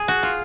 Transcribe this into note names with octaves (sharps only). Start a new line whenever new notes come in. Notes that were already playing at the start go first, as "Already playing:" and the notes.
Already playing: G#4
F#4
F4